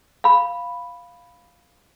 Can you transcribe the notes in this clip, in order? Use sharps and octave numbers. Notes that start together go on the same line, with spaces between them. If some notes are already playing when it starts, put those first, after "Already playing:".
F5 B5